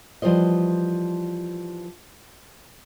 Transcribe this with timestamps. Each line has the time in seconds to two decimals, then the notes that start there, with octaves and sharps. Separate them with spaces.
0.22 E3 F3 G3 C5 D#5